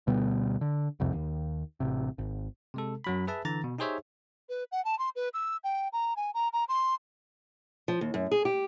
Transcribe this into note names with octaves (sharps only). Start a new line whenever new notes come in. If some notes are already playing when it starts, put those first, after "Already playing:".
D2 B2 G3 B3
D3
C2 F2 C3
D#2
A1 C3
G#1
C3 G#3 A4
F#2 F#3 B5
G#4 B4 E5 A5
D3 E3 A#5 A6
B2
D#4 G4 G#4 C5 C#5 E5
B4
F#5
A5
C6
B4
E6
G5
A#5
G#5
A#5
A#5
C6
F3
D#2
F#2
G#4
G4